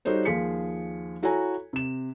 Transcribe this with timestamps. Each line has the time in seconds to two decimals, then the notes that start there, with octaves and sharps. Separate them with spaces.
0.05 G3 D#4 F#4 A4 C5 C#5
0.25 D#2 F3 F4 G#4 B6 C#7
1.23 E4 F#4 A4 C#5 G#5 A#5
1.73 C3 E7